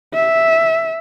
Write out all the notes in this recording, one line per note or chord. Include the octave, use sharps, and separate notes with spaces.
E5